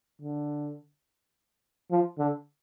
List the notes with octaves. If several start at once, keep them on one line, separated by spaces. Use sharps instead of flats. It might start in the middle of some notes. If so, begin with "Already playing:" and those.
D3
F3
D3